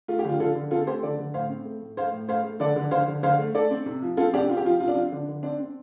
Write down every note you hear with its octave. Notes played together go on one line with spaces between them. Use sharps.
A3 F4
G4
D3 F4
D3 F4 A4
D3
C4 F4 A4
A4
A3 G4 C5
D3 A4 D5
D3
A2 C5 F5
C4
A3
A2
A3 C5 F5
A2
A3 C5 F5
A3
D3 A4 D5
D3
D3 C5 F5
D3
D3 C5 F5
A3
A3 A4 D5
C4
C3
F3
C4 F4 A4
C3 D4 G4
C4 F4
G4
F3 F4
C3 F4
D4
C4 F4
D3 D4
D3
C4 D4
C4